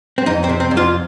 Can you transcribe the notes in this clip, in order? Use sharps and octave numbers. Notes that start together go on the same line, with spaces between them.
C4
F2 D#4
C4
C3
C4
F2
F4